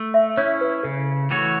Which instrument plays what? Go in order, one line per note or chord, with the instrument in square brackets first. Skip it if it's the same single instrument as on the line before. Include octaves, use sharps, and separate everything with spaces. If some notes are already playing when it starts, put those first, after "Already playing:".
Already playing: [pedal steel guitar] A3
[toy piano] E5
[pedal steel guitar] C#4 E4 [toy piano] C#5
[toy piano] B4
[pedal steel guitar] C#3 [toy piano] A4
[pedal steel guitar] E3 A3 F#4 C#5